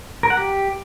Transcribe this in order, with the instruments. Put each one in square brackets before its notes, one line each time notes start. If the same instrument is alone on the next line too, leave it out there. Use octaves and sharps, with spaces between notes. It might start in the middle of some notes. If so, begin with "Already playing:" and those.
[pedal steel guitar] A#4
F#5
G4